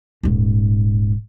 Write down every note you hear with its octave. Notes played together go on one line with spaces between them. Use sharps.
D#1 G#2